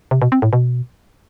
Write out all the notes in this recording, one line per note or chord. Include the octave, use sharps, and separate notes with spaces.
C3
B2
C4
A2
B2